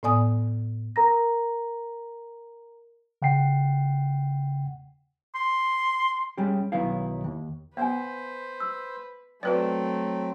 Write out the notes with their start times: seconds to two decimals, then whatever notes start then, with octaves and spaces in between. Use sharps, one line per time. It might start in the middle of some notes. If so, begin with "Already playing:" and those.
0.03 A2 B3 D5 G#5 D#6
0.96 A#4 A#5 A#6
3.22 C#3 F#5 G5 C7
5.35 C6
6.38 G3 G#3 C#4 G4
6.72 B1 D#3 F#3 B3 E4 F5
7.24 D#2
7.77 B3 B4 C5 F5 F#5 G#5
8.60 E6
9.43 F#3 A3 C4 F#4 B4 D5 E5